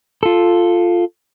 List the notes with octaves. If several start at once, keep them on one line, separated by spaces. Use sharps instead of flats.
F4 A4